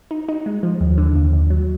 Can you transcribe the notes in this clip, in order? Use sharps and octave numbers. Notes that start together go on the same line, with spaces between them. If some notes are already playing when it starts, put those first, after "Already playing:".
D#4
D#4
G#3
F3
D#2
D3
D#2
D#2
F#3